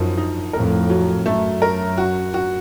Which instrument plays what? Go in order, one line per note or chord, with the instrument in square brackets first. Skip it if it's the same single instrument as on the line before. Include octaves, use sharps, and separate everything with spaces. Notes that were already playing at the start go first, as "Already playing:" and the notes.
Already playing: [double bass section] F#2 [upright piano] F3 D#4
[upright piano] D#4
[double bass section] F2 A2 [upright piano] A#4
[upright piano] F#3
[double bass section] F#2 [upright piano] A3
[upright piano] A#4
F#4
F#4